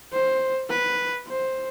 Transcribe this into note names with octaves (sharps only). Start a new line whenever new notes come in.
C5
B4
C5